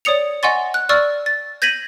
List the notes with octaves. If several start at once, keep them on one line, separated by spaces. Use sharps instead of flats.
C#5 D5 D#6 C#7 F7
D#5 F#5 G#5 C6 C#6 A6
F#6
D5 C#6 E6 F6 A6
A6
G6 G#6 A#6 B6 D#7 F#7